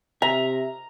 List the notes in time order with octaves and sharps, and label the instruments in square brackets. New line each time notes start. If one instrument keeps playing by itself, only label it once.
[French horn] C3 [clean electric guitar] E5 [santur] A#5